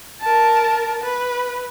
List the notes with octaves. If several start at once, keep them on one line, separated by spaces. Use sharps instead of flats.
A#4 A5
B4